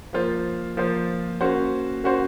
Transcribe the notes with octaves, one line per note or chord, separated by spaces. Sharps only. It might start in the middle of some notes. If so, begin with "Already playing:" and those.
F3 A#3 F4 C5
F3 A#3 F4 C5
A#3 C#4 F#4 C5
A#3 C#4 F#4 C5